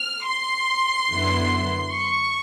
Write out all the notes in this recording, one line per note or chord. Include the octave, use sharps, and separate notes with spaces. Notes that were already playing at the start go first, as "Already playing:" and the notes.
Already playing: F6
C6
F#2 D3 F#3 B3 E4
C#6